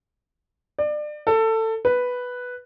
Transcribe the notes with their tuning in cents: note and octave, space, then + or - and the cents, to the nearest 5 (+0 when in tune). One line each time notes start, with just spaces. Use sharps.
D5 +30
A4 +20
B4 +0